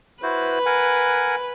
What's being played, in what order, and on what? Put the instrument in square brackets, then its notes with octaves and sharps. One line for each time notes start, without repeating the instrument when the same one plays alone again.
[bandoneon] E4 F#4 C5 [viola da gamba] B4
[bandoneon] A#4 F#5 G#5